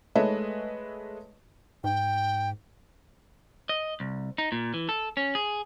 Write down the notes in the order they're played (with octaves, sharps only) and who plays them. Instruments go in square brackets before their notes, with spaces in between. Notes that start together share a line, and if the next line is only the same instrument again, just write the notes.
[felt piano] G#3 A3 B4 C#5 D#5 E5
[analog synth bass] G#2 [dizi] G5
[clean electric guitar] D#5
C2
D#4
A#2
E3
A4
C#4
G#4